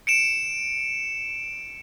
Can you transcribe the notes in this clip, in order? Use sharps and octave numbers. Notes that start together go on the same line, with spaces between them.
C#7 D7 E7